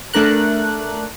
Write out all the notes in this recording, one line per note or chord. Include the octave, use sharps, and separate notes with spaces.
A3 D4 A#4 F#6